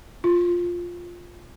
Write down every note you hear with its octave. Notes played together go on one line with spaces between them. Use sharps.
F4